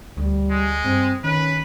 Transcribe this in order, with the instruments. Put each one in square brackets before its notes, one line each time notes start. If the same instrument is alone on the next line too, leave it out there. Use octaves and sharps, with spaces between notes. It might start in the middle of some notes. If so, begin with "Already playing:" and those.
[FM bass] D2 [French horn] G3
[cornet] G#3
[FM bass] G2 [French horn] C4
[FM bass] D#3 [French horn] C#4 [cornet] B4